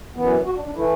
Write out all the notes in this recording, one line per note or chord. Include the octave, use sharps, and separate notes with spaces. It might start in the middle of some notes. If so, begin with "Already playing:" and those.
F#2 E3 B3
F#4
D4
D4
E3 A3 E4